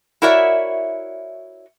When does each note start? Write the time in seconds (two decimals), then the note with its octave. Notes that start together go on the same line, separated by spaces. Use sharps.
0.22 E4 F#4 A#4 C#5 D5 E5